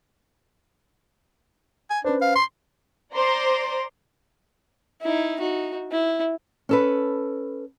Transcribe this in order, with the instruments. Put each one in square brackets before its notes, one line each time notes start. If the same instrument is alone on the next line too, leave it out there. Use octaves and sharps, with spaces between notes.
[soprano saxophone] G#5
[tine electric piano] C#4 B4 C5 [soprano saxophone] D4
[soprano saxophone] F5
C6
[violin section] C5 D5 A#5 C6 D6
[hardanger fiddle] D#4 E4
D#4 F#4
E4
[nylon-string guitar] C#4 A4 B4